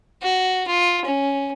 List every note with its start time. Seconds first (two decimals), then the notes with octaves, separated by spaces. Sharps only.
0.22 F#4
0.67 F4
1.05 C#4